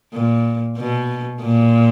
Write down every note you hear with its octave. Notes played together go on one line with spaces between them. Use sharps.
A#2
B2
A#2